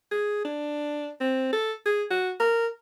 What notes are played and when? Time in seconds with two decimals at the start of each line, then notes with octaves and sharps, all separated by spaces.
0.12 G#4
0.45 D4
1.21 C4
1.53 A4
1.86 G#4
2.11 F#4
2.40 A#4